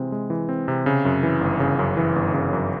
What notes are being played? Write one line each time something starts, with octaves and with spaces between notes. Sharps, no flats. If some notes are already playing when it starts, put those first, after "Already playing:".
Already playing: C3 E3 G#3 C4
G#3
E3
C4
C3
C#3
F#2
E3
G1
C#3
F#2
E3
G1
C#3
F#2